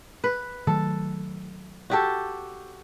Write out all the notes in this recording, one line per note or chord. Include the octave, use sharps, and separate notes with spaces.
B4
D#3 F#3 A3 A4
F#4 G4 A4